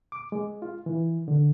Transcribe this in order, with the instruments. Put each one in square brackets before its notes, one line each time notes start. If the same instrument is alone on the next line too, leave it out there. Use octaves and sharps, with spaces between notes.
[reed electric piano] D6
G#3
F4
E3
D3